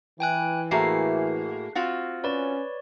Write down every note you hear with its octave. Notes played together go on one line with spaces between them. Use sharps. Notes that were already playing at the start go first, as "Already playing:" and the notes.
E3 G5 G#5 F#6
A2 A#3 F#4 G#4 E5 C7
C4 F4 F#4
C#4 B4 C#5 D5